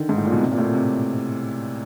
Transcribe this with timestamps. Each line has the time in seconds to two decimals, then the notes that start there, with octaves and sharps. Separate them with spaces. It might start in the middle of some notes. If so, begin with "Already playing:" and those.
Already playing: D3 D#3
0.09 G#2
0.17 A2
0.25 A#2
0.32 B2
0.40 C3
0.52 A#2
0.58 A2
0.63 A#2
0.74 C3